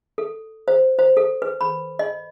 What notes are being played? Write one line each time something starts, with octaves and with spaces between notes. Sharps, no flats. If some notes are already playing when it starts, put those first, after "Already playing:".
A4
C5
C5
A4
B4
B5
D#5